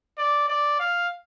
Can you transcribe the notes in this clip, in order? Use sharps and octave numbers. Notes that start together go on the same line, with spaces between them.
D5
D5
F5